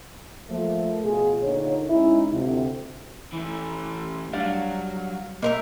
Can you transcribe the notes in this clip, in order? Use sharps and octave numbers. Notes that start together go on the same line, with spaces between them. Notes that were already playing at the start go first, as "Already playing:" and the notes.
F3 A3 A#3
B2 F4 G#4
A#2 D3 D#4 C#5
G#3 C#4 D#4 E4
D2 C3 F4
E3 A3
F#3 G3 D4 F5
A#3 D#4 A#4 E5